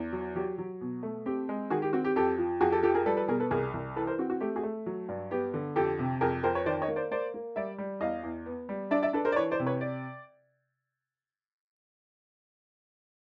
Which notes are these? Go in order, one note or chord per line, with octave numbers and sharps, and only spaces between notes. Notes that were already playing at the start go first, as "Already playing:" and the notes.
Already playing: E2
F#3
F#3 G4
F#3
B2
A3
C4 G4
G#3
D#3 F#4 G#4
G4
C4 F#4
G4
F2 G4 A4
F3
F2 F#4 G#4
G4 A4
F3 G4 A4
G#4 A#4
G3 A4 B4
A4 B4
B2 G#4 A#4
A4 B4
C2 G#4 A#4
C2
E3 A4 B4
A#4 C5
C4 F#4
F#4
A3 G4
F#4 G#4
A3
F#3
G2
B3 G4
D3
F2 G4 A4
C3
F2 G#4 A#4
F2 A#4 C5
B4 C#5
D#3 C5 D5
C#5 D#5
A#3
C5 D5
A#3 C5 D5
A#3
G3 D5 E5
G3
E2 D#5 F5
E2
B3
G3
D4 D5 E5
D5 E5
D4 A4 B4
A#4 C5
D5
E3 B4 C#5
C5 D5
C3
B4 C#5
D5